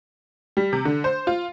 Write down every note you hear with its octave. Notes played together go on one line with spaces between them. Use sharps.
G3
C3
D3
C5
F4